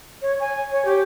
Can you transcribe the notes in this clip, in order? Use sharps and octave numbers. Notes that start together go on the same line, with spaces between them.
C#5
G#5
C#5
G4